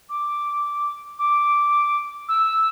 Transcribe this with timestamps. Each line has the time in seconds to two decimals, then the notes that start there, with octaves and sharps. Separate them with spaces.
0.09 D6
1.19 D6
2.28 E6